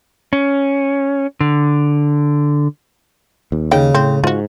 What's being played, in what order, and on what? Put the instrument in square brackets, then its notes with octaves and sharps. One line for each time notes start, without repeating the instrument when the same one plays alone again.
[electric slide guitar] C#4
D3
[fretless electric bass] D#2
[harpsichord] C#3 [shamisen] D#4 G5
[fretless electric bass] A2 [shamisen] C4
[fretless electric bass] G#2 [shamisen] F4 F#4